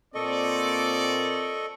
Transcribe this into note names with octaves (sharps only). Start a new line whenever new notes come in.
A#2 C4 A4 D5 D#5 C#6